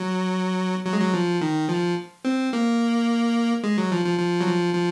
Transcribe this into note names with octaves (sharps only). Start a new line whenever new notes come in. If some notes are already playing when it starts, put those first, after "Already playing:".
Already playing: F#3
F#3
G#3
F#3
F3
D#3
F3
C4
A#3
G#3
F#3
F3
F3
F3
F#3
F3
F3